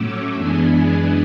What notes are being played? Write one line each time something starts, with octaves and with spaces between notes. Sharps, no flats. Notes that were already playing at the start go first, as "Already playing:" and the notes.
Already playing: A2 F#3 A3 C#4 D6 E6
F#2 E3 G#3 B3 D4 G#5